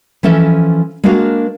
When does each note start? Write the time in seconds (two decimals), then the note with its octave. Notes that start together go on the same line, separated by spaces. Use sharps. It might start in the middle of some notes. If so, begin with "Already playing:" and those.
0.23 E3 F3 C#4 A4 E5
1.04 G#3 A#3 D4 F#4 A#4 F5